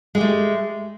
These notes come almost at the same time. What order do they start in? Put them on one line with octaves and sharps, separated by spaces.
G#3 G4 A3